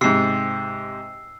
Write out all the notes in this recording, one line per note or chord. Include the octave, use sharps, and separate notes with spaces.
G#2 C3 E6 C7